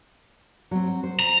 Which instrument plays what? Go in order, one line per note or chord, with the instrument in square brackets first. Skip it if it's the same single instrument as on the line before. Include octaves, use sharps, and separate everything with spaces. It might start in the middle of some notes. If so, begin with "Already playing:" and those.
[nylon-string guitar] F#3 C4
C5
[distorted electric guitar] A#5